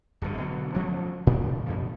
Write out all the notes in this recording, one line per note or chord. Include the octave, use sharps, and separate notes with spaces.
D1 D2 G2 D3
B2 D3 F#3
D2 F3 A3 C#4
A2 D#3 F3 D4
F#2 B2 F3